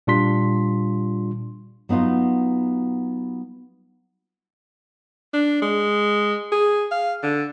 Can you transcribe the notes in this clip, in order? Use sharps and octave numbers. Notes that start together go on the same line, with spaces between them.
A#2 G3 D4 F4 C6 B6
F#3 B3 D#4 F4 F#4
D4
G#3
G#4
F5
D3